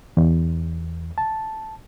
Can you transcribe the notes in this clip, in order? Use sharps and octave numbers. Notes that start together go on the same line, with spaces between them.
E2
A5